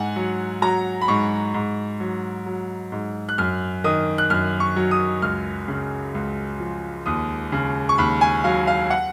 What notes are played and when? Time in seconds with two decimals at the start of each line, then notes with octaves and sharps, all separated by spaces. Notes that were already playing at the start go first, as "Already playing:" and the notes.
Already playing: G#2 F#5 G#5
0.16 F#3
0.62 F#3 A#5
1.01 B5
1.08 G#2 C#6
1.54 G#2
2.00 F#3
2.46 F#3
2.92 G#2
3.29 F#6
3.38 F#2 F6
3.84 D#3 D#6
4.18 F#6
4.30 F#2 F6
4.60 C#6
4.76 F#3
4.91 D#6
5.22 C#2 F6
5.68 C#3
6.14 C#2
6.60 F3
7.06 D#2 D#6
7.52 C#3
7.89 C#6
7.98 D#2 B5
8.21 G#5
8.44 F#3 F5
8.67 F5
8.90 F#5